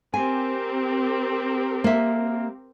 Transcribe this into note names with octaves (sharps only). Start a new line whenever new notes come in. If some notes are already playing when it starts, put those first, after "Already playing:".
C4 G4 A#4 G#5
A#3 E5